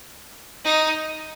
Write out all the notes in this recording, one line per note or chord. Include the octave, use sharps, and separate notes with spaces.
D#4